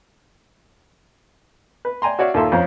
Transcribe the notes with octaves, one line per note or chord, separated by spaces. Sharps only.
B4
D5 G5 G#5 A#5 C6
F#4 C#5 D5 E5 F5
D#2 A#2 A4 E5 C6
F2 C#4 C5 A#5